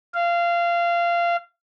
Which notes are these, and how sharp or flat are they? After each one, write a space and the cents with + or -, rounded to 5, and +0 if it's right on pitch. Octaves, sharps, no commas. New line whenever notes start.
F5 -20